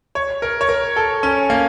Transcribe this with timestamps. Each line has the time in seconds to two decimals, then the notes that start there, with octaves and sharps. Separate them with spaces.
0.15 C#5
0.42 A#4
0.61 C#5
0.69 A#4
0.96 A4
1.23 C#4
1.50 A#3